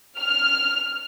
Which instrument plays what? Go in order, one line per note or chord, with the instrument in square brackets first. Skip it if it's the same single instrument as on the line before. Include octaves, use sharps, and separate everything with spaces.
[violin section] F6